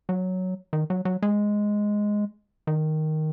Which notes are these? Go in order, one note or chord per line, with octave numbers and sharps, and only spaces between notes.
F#3
D#3
F#3
F#3
G#3
D#3